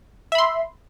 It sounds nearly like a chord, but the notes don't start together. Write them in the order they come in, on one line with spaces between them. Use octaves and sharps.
E5 B5 C6